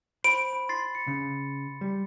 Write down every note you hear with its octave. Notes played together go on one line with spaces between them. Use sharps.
C5 B5 D7
B5
C6 A6 C7
C#7
C#3
G3